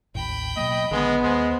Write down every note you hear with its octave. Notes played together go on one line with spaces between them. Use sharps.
A1 D#2 A2 G5 B5
B2 F#3 A#3 D#5
A#1 D3 D#3 G#3 B3
D#2 G#3 C5